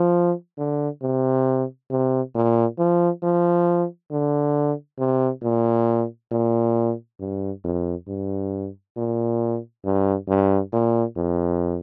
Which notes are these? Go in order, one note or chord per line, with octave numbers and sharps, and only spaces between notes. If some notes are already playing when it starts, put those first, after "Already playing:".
Already playing: F3
D3
C3
C3
A#2
F3
F3
D3
C3
A#2
A#2
G2
F2
G2
A#2
G2
G2
A#2
F2